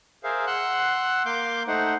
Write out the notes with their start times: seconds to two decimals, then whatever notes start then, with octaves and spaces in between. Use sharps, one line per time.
0.24 G#4 A#4 C5 E5 F5
0.47 F#5 C6 E6 F#6
1.26 A#3 F5 C6 D6 G6
1.67 A3 D#4 C5 F#5